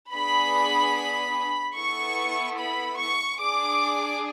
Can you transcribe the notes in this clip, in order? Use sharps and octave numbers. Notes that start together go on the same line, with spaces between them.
B3 D4 G#4 B5
B3 E4 A4 C#6
B5
C#6
D4 G#4 D6